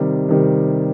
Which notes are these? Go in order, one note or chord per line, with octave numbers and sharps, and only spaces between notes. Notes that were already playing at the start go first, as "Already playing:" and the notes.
Already playing: C3 D#3 G3
C3 D#3 G3